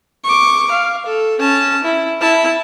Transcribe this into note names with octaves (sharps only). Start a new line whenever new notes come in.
C#6 D6
F5
A4
C#4 A5
E4
E4 A5